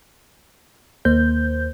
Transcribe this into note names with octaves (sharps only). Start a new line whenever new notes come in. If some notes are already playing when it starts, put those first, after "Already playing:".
D#2 A#3 C5 G6